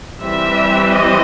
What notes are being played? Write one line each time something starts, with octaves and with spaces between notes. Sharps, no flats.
E3 G3 C4 E5
D#5